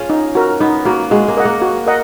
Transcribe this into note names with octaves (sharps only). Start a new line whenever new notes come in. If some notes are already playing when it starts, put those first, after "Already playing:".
Already playing: C#4 F4 G#4
D#4
F#4 A#4
B3 D#4
A#3 F#4 A#4
G#3 F#4
A#3
A#4 D#5 F#5
A#3
F#4
A#4 D#5 F#5